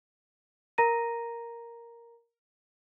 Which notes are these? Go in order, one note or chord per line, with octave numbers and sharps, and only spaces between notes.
A#4 A#5 A#6 D#7